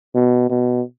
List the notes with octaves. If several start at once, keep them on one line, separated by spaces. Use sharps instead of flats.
B2
B2